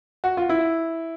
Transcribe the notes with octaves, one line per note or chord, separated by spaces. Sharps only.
F#4
F4
E4